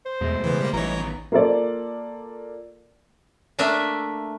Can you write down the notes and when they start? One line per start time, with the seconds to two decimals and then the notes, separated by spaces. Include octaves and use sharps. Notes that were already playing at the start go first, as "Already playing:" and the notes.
0.06 C5
0.21 E2 B2 G#3 A3
0.44 C#3 E3 B3
0.61 G3 A#3
0.73 A1 E3 G3 A3 D#4 C#5 A#5
0.97 D#3 B3
1.32 A#3 F4 A4 D5
3.59 A3 A#3 D4 E5